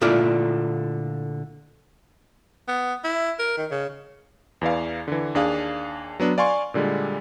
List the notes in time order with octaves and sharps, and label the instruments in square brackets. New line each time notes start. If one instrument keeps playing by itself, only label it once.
[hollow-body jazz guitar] A#2 D3 A3 E4 F4 D5
[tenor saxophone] B3
E4
A#4
D#3
C#3
[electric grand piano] E2 E3 D5 F5
D3 E3
D#2 D4 G#4 F5
F#3 B3 D4
D5 F5 G#5 C6 C#6
A#2 D3 G3 G#3